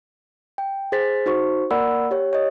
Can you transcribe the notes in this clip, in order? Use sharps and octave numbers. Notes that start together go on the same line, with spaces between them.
G5
G#4 C5 A6 B6
D#4 F#4 C5 C#6
A#3 A#4 D5 F#5 B5 E6
G4 C#5
C#5 D#5